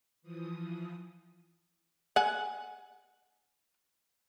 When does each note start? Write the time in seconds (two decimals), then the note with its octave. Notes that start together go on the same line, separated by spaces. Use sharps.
0.22 E3 F3 D#6
2.16 F#5 G#5